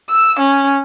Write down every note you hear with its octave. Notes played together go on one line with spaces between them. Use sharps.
E6
C#4